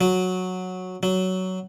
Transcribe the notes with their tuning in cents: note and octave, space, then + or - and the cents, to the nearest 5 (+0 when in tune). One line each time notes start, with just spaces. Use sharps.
F#3 -10
F#3 +10